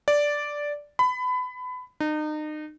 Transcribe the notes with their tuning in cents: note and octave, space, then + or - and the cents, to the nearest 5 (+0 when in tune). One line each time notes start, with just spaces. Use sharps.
D5 -5
B5 +25
D#4 -35